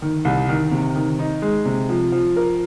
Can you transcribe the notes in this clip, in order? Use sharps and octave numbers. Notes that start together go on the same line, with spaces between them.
D#3
C2
D#3
C3
D#3
D#4
G#3
C3
F3
F3
A#4